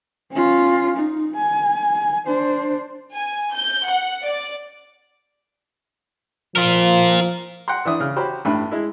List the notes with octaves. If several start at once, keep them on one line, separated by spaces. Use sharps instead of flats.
C#4 F4
D#4
G#5
D4 C5
G#5
G6
F#5
D5
F3 F4 A#4
F#5 G5 A#5 C6
E3 D4 E5 D#6
C#3 F6
F#4 G4 C5 C#5 A#5 B5
A1 G2 E5 B5
G#3 E4